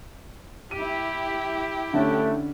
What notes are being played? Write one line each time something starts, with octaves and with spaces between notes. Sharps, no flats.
E4 G4 D#7
D3 A3 C#4 D4 A4